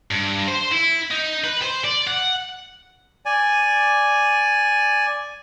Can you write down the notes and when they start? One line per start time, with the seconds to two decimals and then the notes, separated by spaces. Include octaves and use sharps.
0.11 G2
0.48 C5
0.72 E4
1.11 D#4
1.44 B4
1.62 C5
1.84 D5
2.07 F#5
3.25 D5 G#5